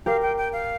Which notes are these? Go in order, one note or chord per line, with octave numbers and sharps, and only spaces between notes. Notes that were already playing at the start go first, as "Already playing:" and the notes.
G4 A#4 F5
G5
G5
F5